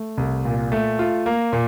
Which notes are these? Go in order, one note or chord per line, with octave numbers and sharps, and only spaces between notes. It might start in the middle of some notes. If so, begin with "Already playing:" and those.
Already playing: A3
C2
A#2
A3
F4
A#3
A#2